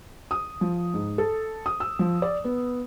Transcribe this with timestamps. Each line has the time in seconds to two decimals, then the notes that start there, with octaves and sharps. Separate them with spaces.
0.31 D#6
0.61 F3
0.94 G#2
1.18 A4
1.66 D#6
1.80 E6
1.99 F3
2.22 D5
2.45 B3